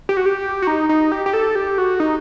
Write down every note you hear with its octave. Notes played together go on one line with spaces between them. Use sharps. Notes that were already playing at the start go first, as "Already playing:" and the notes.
G4
F#4
G4
F#4
D#4
D#4
G4
G4
A4
G4
F#4
D#4